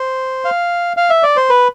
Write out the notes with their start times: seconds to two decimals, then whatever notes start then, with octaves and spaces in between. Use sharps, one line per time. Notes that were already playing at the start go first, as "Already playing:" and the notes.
Already playing: C5
0.45 F5
0.97 F5
1.10 E5
1.23 D5
1.36 C5
1.50 B4